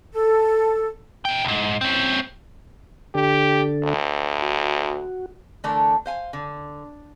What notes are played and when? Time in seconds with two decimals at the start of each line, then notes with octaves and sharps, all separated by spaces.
0.14 A4
1.25 A#2 G5
1.44 C2 G#2
1.81 C4 C#4
3.15 D3 D4 G4 A4
3.84 D2
4.42 F#4
5.64 D3 E3 A3 D4 A4 A#4
6.06 C5 F5 G#5
6.33 D3